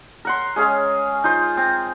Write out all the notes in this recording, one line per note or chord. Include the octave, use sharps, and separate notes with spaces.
A#4 F#5 C6
G#3 C#4 G#4 F5
D#4 F4 C5
C4